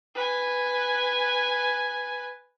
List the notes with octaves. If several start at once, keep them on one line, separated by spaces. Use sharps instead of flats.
B4 G#5